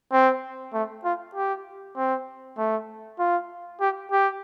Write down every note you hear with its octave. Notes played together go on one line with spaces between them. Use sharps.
C4
A3
F4
G4
C4
A3
F4
G4
G4